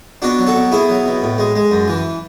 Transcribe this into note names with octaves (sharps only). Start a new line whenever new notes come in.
B2 D4 F#4
F#3
F#4 A4
B2
B2 E4 G#4
F#3
B2
A2
G#3
G#3
F#2
E3